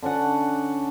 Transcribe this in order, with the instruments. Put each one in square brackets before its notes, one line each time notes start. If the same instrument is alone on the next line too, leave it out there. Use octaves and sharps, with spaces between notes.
[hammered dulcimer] D3 C#4 D4 F#5